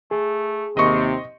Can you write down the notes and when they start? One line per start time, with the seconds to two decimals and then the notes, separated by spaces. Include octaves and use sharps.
0.11 A3 G#4
0.77 D#2 C3 C4 D#5 C#6